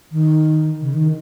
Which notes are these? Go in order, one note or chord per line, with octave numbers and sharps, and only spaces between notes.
D#3
C#3
D#3